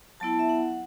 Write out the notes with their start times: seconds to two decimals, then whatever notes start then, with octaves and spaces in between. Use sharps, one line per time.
0.20 F#3 B3 E4 A5
0.39 E5
0.49 F#5